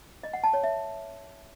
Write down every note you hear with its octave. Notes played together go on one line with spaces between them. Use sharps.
D#5
F#5
A5
C#5
E5